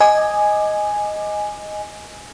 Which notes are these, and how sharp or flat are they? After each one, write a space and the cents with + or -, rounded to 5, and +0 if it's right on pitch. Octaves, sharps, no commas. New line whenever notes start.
D#5 +0 G#5 +0 D6 +20